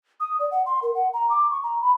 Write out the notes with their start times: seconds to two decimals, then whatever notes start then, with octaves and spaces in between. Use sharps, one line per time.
0.20 D#6
0.39 D5
0.51 F#5
0.66 C6
0.83 A#4
0.95 F#5
1.13 A#5
1.30 D6
1.51 C#6
1.63 A#5
1.81 B5